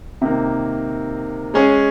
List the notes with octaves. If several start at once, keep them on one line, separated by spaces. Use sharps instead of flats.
C3 D#3 A#3
G#3 C#4 G#4